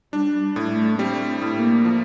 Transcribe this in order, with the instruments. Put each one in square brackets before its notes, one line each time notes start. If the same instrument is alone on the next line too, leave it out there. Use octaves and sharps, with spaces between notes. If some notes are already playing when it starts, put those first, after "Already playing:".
[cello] G3 [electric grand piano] D4
[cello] G3
[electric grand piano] A2
[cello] A3
[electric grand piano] G3 [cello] C4
[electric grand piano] A2
[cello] A#3
[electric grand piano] F3